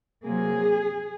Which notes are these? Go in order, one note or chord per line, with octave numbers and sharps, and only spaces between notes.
C3 F#3 A#3 G#4